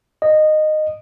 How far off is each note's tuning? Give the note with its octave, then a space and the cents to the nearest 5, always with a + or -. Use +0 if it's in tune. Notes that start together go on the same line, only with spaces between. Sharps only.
D#5 -15